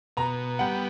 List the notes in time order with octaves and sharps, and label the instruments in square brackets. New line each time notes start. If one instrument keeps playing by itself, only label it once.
[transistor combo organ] B2 [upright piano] A#5
[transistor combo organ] G3 B3 [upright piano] F#5